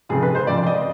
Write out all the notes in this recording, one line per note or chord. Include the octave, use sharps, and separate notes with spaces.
F1 F2 C#3 G#4
B4
C5
F1 F2 C#3 D5
D#5